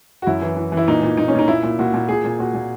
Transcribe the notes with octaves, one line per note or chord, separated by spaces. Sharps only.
F#4
F#2 E4
E3
E3
E3
E4
A#2 D#4
A#2
A#2 D#4
C#4
A#2 D#4
A#2 E4
A#2
A#2 F#4
A#2
A#2 G#4
A#2
A#2 F#4
A#2